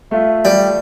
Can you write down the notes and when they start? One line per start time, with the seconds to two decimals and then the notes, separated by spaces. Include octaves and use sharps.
0.11 A3 F4 E5
0.45 G3